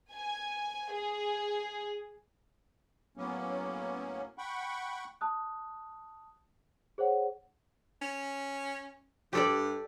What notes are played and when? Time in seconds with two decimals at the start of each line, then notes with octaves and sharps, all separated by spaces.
0.13 G#5
0.92 G#4
3.17 A2 F#3 A#3 B3 C#4
4.38 F#5 G5 B5 C#6
5.21 A5 D#6 F#6
6.98 G#4 C5 C#5 F#5
8.02 C#4
9.33 G2 G4 A4 D5